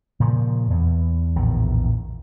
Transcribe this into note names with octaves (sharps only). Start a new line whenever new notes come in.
A#2 C#3 F3
E2
A#1 E2 A2 D#3